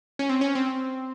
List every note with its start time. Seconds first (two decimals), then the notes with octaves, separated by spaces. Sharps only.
0.19 C#4
0.29 C4
0.41 C#4
0.55 C4